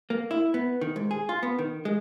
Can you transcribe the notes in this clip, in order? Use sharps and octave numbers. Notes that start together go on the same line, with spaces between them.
A#3
E4
B3
D#3
G#2
G#4
F4
B3
D#3
G#3